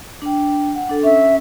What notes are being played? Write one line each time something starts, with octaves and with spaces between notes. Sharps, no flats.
D4 G5
F#5
D4 A4
C#4 E5